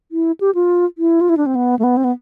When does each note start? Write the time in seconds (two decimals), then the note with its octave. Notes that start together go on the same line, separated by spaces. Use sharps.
0.12 E4
0.41 G4
0.55 F4
0.98 E4
1.21 F4
1.29 E4
1.37 D4
1.46 C4
1.55 B3
1.79 A3
1.84 B3
1.97 C4
2.04 B3